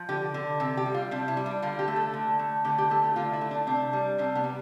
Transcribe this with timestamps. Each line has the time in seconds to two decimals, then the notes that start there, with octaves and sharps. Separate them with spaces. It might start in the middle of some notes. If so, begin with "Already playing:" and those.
Already playing: F3
0.09 D3 G4
0.34 D3
0.60 C3 A4
0.77 G4
0.86 G3
0.94 F4
1.11 C3 D4
1.28 E4
1.37 G3
1.46 D4
1.62 D3 F4
1.79 G4
1.88 A3
1.96 A4
2.14 D3
2.39 A3
2.64 D3 G4
2.78 G4
2.90 A3 A4
3.04 G4
3.16 D3 F4
3.33 E4
3.41 A3
3.51 D4
3.67 C3 D4
3.93 G3
4.18 C3 D4
4.35 B3
4.44 G3